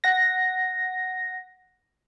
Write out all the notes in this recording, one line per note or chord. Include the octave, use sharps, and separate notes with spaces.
F#5 A#6